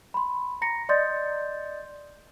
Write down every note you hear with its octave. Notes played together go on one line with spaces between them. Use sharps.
B5 C6
A#5 A#6 C#7
D5 D#5 C6 D#6 G6 A6